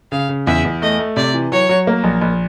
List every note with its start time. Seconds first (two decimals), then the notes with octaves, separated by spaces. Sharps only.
0.12 C#3 F5
0.29 C#3
0.47 E2 E5
0.65 E2
0.82 A3 D#5
0.99 A3
1.17 C3 D5
1.34 E3
1.52 F#3 C#5
1.69 F#3
1.87 A#3
2.04 A#1
2.21 A#1